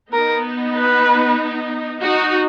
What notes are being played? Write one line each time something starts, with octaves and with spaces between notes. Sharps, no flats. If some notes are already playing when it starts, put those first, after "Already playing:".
B3 D#4 A#4
B4
D#4 F#4